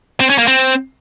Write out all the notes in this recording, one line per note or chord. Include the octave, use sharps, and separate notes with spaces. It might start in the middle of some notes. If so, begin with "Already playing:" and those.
C4
C#4
A#3
C4